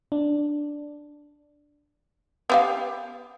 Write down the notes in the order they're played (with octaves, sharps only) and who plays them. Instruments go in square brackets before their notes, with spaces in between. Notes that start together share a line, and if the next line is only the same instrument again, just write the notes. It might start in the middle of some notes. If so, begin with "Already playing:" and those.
[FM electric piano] D4
[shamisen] B3 G4 F5